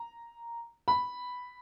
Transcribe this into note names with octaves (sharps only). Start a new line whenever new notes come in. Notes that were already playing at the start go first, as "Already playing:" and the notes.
Already playing: A#5
B5